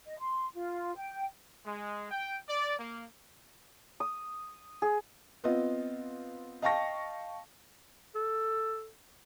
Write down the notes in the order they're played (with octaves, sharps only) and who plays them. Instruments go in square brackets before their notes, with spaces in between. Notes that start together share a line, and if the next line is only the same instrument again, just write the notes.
[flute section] D#5
C6
F4
G5
[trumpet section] G#3
G5
D5
A#3
[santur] D#6
G#4
[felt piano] B3 C4 F4 D#5
D#5 F5 G5 A5 C#6 A#6
[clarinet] A4